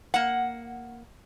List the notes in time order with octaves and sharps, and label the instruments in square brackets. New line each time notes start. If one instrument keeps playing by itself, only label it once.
[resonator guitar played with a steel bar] A#3 F#5